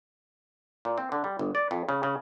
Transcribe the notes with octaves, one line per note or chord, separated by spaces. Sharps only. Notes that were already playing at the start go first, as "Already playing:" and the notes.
A#2
C4
D3
G3
G1
D5
F2
C#3
C#3